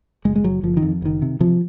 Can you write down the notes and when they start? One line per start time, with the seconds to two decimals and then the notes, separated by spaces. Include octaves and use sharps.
0.25 F#1 G#3
0.36 G#3
0.44 F#1 F#3
0.63 F#1 F3
0.77 D#3
0.82 F2
1.02 F#1 D#3
1.22 C3
1.40 C3 F3